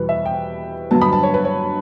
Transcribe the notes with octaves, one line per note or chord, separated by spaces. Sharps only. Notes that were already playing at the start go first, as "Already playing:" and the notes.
Already playing: E2 B2 G3 B3 B4
E5
G5
G2 D3 F#3 B3 A5
B5
A5
C#5
B4
C#5